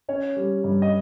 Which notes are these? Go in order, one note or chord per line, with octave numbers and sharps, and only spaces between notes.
C#4 C#5
G3
G2
D#5